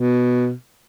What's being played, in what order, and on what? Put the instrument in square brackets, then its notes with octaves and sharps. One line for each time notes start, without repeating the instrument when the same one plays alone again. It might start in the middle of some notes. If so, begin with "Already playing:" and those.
Already playing: [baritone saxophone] B2